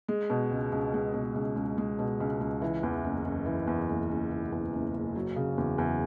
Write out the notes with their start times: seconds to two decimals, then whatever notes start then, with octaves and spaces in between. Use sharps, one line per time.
0.08 G#3
0.30 B2
0.52 C#2
0.72 C#2
0.94 G#3
1.14 B2
1.35 C#2
1.56 C#2
1.78 G#3
1.99 B2
2.20 C#2
2.41 C#2
2.62 E3
2.83 E2
3.04 F#1
3.25 F#1
3.46 E3
3.67 E2
3.89 F#1
4.10 F#1
4.31 E3
4.52 E2
4.73 F#1
4.94 F#1
5.15 F#3
5.36 C#3
5.58 E2
5.78 E2